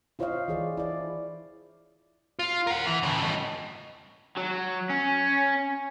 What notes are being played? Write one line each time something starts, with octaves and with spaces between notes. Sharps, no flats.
E4 F4 C5 C#5 D#5 F5
E3 G#4 D5
E4 D5
F4
A#4 F#5
E3
A2 C#3
G2 D#5
F#3
C#4